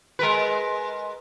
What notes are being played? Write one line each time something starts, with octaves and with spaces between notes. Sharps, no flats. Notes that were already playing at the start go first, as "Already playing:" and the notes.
G#3 A#4 B4